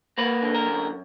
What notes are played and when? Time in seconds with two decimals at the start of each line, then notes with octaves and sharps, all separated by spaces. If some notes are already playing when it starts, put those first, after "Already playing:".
0.18 A#3 B4
0.42 D3
0.54 A#4
0.66 F#2